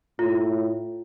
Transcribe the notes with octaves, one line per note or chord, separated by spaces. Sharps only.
A2 F4